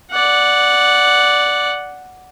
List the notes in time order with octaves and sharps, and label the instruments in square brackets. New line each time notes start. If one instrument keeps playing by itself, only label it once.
[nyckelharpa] D5 F#5